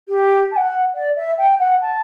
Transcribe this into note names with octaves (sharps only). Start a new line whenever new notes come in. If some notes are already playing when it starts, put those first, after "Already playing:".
G4
A5
F#5
D5
E5
G5
F#5
A5